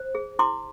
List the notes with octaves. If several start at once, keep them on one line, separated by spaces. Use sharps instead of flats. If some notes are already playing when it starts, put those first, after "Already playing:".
Already playing: C5
G#4
E4 C6 D6